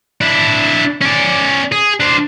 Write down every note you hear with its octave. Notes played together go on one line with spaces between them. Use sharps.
D4 E4
C#4 D5
G#4
D4 C5